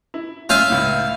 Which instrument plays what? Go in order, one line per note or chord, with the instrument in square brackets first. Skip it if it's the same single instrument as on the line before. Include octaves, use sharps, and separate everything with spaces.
[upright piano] E4
[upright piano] C#4 G6 D#7 [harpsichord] F4 E5 F5
[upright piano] C#2 A2